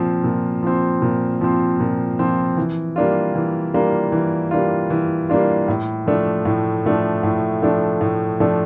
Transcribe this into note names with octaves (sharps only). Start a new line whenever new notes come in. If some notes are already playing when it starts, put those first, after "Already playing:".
Already playing: A#2 F3 C4
A#2
F3 C4
A#2
F3 C4
A#2
F3 C4
E3
G3 A#3 D4 F4
E3
G3 A#3 D4 F4
E3
G3 A#3 D4 F4
E3
G3 A#3 D4 F4
A2
F3 A3 D4
A2
F3 A3 D4
A2
F3 A3 D4
A2
F3 A3 D4